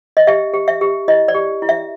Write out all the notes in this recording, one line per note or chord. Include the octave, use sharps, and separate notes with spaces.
D#5
G4 E5
G4
E5
G4
E4 D#5
D5
G4
E4
E5